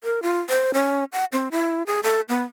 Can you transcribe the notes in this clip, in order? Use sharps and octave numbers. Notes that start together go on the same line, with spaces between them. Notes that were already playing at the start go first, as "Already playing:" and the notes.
A#4
F4
C5
C#4
F#5
C4
E4
G#4
A4
B3